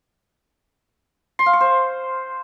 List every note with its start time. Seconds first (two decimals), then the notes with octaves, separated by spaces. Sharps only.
1.39 C6
1.46 F5
1.53 C#6
1.61 C5